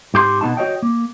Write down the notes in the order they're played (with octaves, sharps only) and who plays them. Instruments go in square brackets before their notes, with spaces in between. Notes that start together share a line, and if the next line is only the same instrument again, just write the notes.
[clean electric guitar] G#2 G4 B4 C6
B2 B3 D#4 A5
F#4 C#5 D#5 G5
A#3